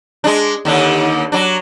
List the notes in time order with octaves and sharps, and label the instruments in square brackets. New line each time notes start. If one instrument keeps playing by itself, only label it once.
[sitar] G#3 D4
D#2 D3 D4
F#3 D4